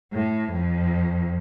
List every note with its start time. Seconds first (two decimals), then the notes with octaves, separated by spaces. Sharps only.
0.13 A2
0.51 F2